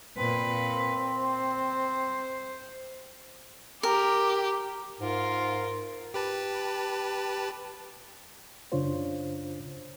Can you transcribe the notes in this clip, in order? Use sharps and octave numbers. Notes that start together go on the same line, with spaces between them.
A#2 C4 B4
C5
G4 A#4
G#2 F4 A#4
G4 B4 A5
F#2 C#3 D4 F4 C5 C#5